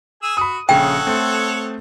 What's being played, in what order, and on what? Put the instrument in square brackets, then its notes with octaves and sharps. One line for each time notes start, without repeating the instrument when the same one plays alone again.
[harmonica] G#4 G#5 E6
[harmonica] F#4 [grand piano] B5 D#6
[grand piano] A#1 C#3 [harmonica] A4 C#5 F#5 [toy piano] G5
[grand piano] A3 C4